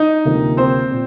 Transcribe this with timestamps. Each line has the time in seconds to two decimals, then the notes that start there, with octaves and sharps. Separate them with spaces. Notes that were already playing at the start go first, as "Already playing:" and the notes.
Already playing: D#4 D#5
0.25 D2 C3 F3 A#3
0.57 C4 C5
0.91 A#2